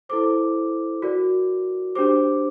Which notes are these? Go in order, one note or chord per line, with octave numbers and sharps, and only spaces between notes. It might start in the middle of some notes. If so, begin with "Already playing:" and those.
E4 A4 C5 D6
F#4 A#4 D5
D4 G4 C5 D6